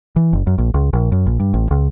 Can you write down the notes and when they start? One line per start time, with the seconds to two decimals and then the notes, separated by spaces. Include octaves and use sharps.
0.16 E3
0.33 F#1
0.47 F#2
0.58 A#1
0.74 C#2
0.93 A#1
1.12 F#2
1.26 A#1
1.40 G2
1.54 A1
1.71 C#2